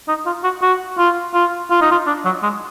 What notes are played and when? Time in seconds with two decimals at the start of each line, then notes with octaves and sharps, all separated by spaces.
0.08 D#4
0.26 F4
0.44 F#4
0.62 F#4
0.98 F4
1.34 F4
1.70 F4
1.82 D#4
1.92 F4
2.07 D4
2.25 F#3
2.43 G#3